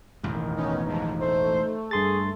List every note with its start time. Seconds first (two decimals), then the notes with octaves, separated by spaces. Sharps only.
0.23 E1 A1 F2 D#3
0.56 B3 C#4 D#4
0.87 D#2 G#2 F3 D#4
1.19 A3 C5
1.91 G2 G#4 C6 A6